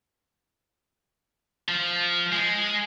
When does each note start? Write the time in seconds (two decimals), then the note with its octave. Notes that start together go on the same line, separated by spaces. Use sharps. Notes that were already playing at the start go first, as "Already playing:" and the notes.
1.68 F3
2.32 G#3